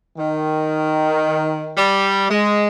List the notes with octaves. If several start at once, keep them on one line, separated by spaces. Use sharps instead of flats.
D#3
G3
G#3